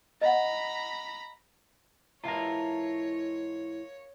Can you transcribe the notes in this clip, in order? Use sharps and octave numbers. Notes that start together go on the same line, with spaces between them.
D#5 F#5 A#5 B5
G#2 E3 F4 A#4 C#5 E5 A5 A#5